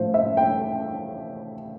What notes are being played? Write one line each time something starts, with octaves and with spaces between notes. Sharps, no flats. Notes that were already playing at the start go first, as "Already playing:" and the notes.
Already playing: A2 F3 A3 C5
E5
G5